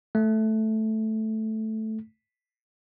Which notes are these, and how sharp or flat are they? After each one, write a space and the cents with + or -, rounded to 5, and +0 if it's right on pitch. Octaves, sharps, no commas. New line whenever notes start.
A3 -5